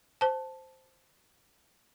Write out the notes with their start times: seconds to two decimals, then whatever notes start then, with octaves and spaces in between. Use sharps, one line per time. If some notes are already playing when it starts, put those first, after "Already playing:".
0.21 C5 A5